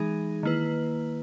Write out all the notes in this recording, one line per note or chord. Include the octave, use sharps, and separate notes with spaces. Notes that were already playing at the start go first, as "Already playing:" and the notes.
Already playing: E3 G#3 D#4 G#4
D#3 A#3 E4 B4